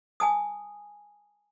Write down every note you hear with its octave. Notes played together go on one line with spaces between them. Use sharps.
G#5 A5 D#6